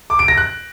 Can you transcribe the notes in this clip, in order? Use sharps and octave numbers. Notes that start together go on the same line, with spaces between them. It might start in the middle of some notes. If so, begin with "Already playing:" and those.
D6
D7
A#6
F#6